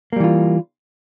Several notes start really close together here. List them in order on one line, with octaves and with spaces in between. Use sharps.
A#3 G3 E3 F4